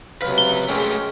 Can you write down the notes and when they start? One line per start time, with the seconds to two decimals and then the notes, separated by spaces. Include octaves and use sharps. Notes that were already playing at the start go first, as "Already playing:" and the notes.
0.22 C#2 C3 F#3 B4 F5
0.38 G7
0.68 G#3 A3 C#4 G4 A#4